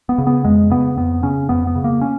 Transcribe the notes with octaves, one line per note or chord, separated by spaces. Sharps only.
B3
C#3
B3
F2 G#3
C#3 B3
F2 B3
C#3 C#4
F2 B3
B3
C#3
A#3
C#4